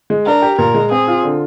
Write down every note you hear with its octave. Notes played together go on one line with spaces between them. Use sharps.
G#3
D4 A#4
G4
A#2 A#4
G#3
C4 G#4
F4
D3